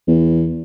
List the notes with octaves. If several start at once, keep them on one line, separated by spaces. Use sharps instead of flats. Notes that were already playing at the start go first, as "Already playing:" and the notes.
E2